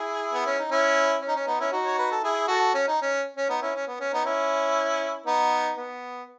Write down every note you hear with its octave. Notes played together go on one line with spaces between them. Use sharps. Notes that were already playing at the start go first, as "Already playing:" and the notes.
Already playing: E4 G#4
B3
C#4
D#4
C#4 E4
C#4
D#4
C#4
B3 D#4
C#4 E4
D#4 F#4
C#5
B4
A4
E4 G#4
F#4 A4
C#4
D#4
C#4
C#4
B3 D#4
C#4 E4
C#4
B3
C#4
B3 D#4
C#4 E4
B3 D#4
B3